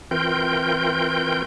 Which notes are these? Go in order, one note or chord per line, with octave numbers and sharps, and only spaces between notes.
E3 C4 F4 A#4 G5 G6